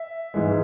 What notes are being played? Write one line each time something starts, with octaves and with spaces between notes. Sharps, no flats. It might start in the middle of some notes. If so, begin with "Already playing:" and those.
Already playing: E5
G#2 E3 G#3